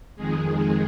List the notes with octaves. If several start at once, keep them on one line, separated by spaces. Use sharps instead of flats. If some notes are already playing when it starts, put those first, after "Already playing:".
F2 D#3 G#3 G#4